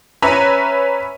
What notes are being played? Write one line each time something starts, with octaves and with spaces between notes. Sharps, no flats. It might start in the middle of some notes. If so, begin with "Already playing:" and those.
C#4 B4 C#5 E5 A#5 B5